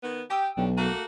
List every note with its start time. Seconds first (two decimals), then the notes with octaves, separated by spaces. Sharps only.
0.03 D#3 B3
0.30 G4 G5 D#6 E6
0.57 B1 G3 C#4 D4
0.77 A3 A#3 F#4 A#5 D6 F#6